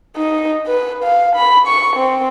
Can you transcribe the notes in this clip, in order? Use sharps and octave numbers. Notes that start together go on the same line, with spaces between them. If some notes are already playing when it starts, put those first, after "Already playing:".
D#4
B4
F5
B5
C#6
C4